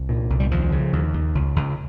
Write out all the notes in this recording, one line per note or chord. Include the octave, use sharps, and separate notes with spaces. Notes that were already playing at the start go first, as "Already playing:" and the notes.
Already playing: C2
A#2
C2
G3
D#2 F3
C#3
D#2
D#2
C#2
C#2